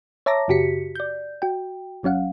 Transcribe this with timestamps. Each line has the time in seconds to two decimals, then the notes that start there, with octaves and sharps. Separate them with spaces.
0.26 C#5 E5 A5 A#5 D6 A#6
0.48 F#2 C#3 F#4 G4 B6 C#7
0.95 D5 G6
1.42 F#4 G5
2.03 G1 F#3 C#4 F5 F#5